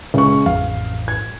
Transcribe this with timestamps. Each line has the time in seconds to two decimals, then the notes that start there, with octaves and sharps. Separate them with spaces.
0.14 C#2 C#6
0.46 A1 F2 F3 F5
1.08 G#6